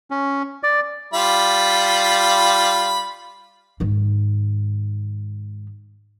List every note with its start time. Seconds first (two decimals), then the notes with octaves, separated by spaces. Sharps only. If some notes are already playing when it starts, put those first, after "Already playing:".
0.11 C#4
0.63 D5
1.14 G3 F4 B5
3.80 G#2 D#3